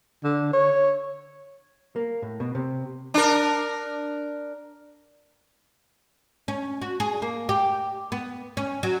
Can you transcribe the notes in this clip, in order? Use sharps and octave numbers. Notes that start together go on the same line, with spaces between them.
D3
C#5
A#3
A2
B2
C3
D4 A#4
C#4
F#4
G#4
A#3
G4
B3
C#4
F#3